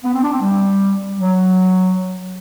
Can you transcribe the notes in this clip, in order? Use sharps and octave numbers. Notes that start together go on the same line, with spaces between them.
B3
C4
D4
C4
G3
F#3